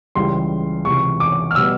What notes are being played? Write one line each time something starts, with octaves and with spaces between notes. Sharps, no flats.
C#2 C#3 E3 G3 C6
C#2 C3 E3 C#6
D6
F6
B2 G3 B3 E6